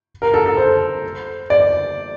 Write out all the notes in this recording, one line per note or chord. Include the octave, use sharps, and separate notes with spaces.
A#4
A4
A4
C5
D5